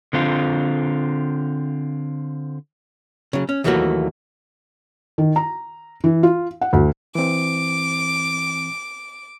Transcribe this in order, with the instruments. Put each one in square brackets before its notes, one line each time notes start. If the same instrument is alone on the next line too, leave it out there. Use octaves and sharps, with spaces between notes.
[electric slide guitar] D3 C4 F4
[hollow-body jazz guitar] C#3 F#3
C#4
D#2 E3 F#3 A3 A#3 F#4
[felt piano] D#3
A#5
E3
F4
F#5
D2
[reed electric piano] E3 C4 [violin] D6